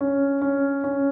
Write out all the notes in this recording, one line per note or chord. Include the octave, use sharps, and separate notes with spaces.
C#4
C#4
C#4